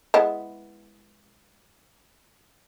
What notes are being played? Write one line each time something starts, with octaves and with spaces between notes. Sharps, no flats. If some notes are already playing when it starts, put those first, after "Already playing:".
G#3 B3 E4